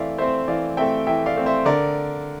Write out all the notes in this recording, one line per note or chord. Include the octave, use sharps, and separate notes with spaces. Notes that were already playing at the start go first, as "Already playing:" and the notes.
Already playing: E3 A3 C4 D5 E5 F5
A3 C4 C5 E5
E3 D5 F5
A3 C4 E5 G5
E3 E5 G5
D5 F5
A3 C4
C5 E5
D3 A#4 D5